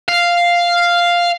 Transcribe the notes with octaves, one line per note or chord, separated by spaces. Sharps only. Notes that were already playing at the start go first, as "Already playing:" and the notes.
F5